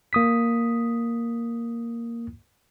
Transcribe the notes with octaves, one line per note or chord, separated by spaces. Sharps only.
A#3 D#6 B6